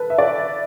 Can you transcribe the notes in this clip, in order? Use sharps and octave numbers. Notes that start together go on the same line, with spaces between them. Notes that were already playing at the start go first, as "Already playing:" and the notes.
Already playing: A4 B4
E5
D5